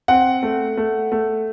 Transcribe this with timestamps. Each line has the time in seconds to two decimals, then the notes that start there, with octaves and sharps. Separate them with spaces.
0.08 C4 F#5
0.43 A3
0.77 A3
1.12 A3